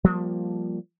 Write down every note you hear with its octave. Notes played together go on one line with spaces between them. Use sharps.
F3 G3 A#3